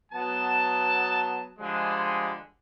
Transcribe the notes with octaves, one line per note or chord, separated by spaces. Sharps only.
F#3 B3 A5
D3 F3 G3 G#3